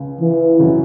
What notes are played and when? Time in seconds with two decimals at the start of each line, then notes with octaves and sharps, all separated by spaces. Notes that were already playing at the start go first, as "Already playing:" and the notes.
Already playing: C#2 C#3
0.21 E3
0.59 F#2 C#3 F#3 E4